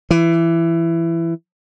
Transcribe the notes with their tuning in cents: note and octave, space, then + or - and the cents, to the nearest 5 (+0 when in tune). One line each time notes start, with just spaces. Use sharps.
E3 +15